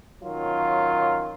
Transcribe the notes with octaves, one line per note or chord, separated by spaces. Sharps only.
D#3 F#3 C#4 F4